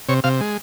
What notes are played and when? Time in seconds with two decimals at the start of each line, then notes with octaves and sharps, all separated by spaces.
0.09 C3 C#5
0.24 C3 F5
0.41 G#3